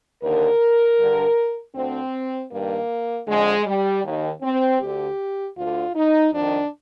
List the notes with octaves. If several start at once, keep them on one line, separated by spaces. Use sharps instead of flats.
D#2 D3 A#4
G2 D3
D2 D3 C4
G2 D#3 A#3
F2 D3 G#3
G3
D#2 D#3
C4
D2 D3 G4
D2 D3 F4
D#4
F2 D#3 D4